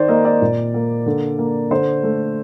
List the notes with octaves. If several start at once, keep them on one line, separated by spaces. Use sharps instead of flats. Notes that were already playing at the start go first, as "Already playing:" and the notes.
Already playing: D#3 C5 D5
A#3 D#5
D5
A#2
A#3
D3
A#3
D3 C5
A3